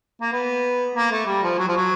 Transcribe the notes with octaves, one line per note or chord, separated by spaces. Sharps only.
A#3
B3
A#3
A3
G3
F3
F#3
F3
F#3